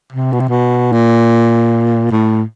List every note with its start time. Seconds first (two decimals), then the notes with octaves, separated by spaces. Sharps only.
0.12 C3
0.32 B2
0.40 C3
0.49 B2
0.92 A#2
2.11 A2